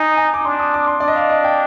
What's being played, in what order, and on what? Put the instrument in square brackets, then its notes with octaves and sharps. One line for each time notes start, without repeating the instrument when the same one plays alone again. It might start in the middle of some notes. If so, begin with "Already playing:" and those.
Already playing: [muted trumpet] D#4 [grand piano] G#5
[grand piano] G#5
D6
[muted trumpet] D4 [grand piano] C6
[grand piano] D#6
D6
C6
[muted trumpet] D4 [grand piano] D5
[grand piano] D#5
F5
D#5
G5